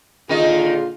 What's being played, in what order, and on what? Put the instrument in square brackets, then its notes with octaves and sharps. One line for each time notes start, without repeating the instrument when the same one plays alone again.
[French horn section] A#2 D3 F4 [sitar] D#3 D#4 [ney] G#4